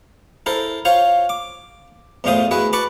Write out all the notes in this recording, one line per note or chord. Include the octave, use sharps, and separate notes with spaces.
E4 A4 A#4 C5
F4 C5 C#5 F5
D6
E2 A2 E3 F4 C5 D#6
G#3 E4 F#4 B4
B4 A5 B5 C#6 D6